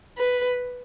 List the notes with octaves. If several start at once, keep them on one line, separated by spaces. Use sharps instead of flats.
B4